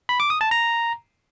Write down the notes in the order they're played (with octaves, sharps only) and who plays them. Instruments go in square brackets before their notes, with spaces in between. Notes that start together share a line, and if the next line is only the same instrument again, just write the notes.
[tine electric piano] B5
D6
D#6
A5
A#5